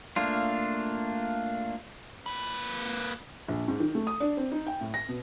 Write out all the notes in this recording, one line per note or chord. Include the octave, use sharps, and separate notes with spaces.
A3 A#3 D4 F4
A#3 B4
A#1
G#2
D#3
A3
D#6
D4
C4
D#4
G5
A2
A#6
B2